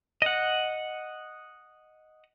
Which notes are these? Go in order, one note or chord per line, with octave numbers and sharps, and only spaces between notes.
D#5 F#5